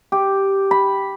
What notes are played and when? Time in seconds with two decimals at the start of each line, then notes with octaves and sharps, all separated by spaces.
0.12 G4
0.71 B5